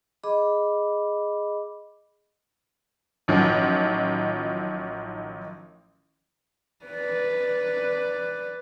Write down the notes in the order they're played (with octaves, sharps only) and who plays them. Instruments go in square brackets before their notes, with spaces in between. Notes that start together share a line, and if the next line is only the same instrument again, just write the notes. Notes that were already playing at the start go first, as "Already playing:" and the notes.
[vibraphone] G#4 D#5 B5 D6
[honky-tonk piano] A1 D#3 F3 F#3
[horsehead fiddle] B4 D5